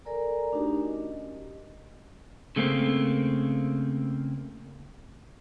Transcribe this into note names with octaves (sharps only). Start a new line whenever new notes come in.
A4 A#4 D5 G#5 A#5
A3 D4 D#4 F#4 G4
C#4 D#5
C#3 A3 A#3 C4